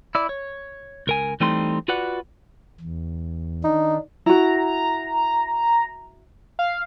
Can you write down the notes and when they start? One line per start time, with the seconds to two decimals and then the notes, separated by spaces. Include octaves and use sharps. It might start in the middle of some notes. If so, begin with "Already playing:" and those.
0.15 E4 D5
0.29 C#5
1.07 C#2 A#4 G#5
1.40 E3 G3 A3 C4 D#4 C6
1.88 F4 F#4 B4 D5 F#5
2.80 E2
3.64 D#3 D4 D#4
4.26 E4 F#4 A#5
6.59 F5